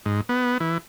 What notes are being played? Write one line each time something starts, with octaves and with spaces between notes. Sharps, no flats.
G#2
B3
E3